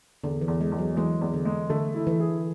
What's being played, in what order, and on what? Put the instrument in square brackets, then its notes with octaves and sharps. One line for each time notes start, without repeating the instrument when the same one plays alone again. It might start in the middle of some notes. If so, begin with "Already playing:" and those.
[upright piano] E2 [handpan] D3
[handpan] E3
[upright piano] E2
[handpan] G#3
[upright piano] E2
[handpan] F#3
[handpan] E3 [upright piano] G#3
[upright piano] E2
[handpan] D3
[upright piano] G#3
[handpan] D3 [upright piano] A3
[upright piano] E4
[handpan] E3
[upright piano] G#4